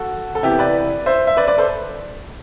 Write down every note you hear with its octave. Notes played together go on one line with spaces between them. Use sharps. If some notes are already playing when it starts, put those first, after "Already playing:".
Already playing: F#4 A4
A4
C3 E3 B3 E4 G4
B4 D5
C5 E5
E5
B4 D5
B4 D5
A4 C5